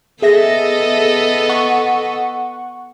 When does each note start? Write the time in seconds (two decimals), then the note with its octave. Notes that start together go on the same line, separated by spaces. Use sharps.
0.22 B3 G#4 A4 D#5 E5 A#6
1.49 F#5 C#6